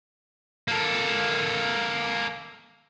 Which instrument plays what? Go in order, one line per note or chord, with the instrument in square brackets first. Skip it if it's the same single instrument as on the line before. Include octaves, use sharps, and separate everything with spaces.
[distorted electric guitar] A#3 A4